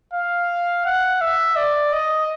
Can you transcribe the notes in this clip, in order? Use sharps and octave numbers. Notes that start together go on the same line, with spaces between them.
F5
F#5
E5
D5
D#5